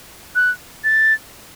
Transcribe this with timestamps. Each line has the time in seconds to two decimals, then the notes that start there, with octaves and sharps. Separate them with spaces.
0.35 F#6
0.84 A6